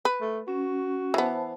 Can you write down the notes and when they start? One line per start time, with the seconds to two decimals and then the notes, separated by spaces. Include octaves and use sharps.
0.05 B4
0.21 A3
0.48 C#4 F#4
1.14 E3 B3 C5 A5